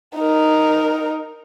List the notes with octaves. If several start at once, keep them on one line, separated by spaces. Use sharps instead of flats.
D#4 A#4